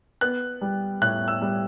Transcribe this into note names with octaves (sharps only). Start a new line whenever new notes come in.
B3 F#6
G3
A2 F#6
E6
G3